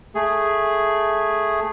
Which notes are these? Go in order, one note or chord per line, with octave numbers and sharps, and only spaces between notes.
A3 G#4